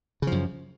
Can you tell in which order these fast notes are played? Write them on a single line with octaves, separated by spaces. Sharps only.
C#3 F3 F#2